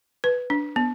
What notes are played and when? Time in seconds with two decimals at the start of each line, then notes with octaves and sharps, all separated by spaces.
0.24 B4
0.50 D4
0.76 B3